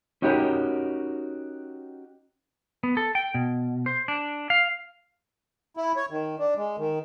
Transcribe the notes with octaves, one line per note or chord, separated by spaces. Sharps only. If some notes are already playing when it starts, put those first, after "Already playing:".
C#4 D#4 F#4 G4 A#4 C#5
B3
A4
G5
B2
C5
D4
F5
E4
C#5
D#3
D4
G#3
D#3